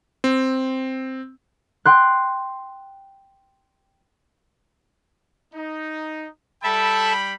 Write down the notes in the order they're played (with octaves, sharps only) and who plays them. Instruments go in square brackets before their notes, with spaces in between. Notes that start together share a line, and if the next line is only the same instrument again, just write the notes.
[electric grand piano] C4
[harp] G5 C6 F#6
[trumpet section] D#4
[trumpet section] G3 G5 B5 [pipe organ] A4 E5 A5